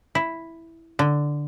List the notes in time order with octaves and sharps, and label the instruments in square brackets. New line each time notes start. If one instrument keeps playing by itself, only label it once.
[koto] E4
D3